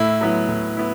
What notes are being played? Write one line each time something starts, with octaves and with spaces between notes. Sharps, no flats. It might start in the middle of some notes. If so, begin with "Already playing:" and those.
Already playing: A2 E4
F#3 B3 E4
A2
B3 E4